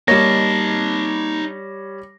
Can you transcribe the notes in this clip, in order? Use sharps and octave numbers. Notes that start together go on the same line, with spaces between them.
G3 A#3 D#4 C#5 D#5 A5 A#6